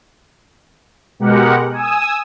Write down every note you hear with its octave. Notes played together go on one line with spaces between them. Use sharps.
B2 G#3 G4 A#4 F#5
G#5 D#6 E6